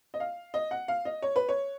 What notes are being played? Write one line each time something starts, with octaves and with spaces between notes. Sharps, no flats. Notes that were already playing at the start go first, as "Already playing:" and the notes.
D#5
F5
D#5
F#5
F5
D#5
C#5
B4
C#5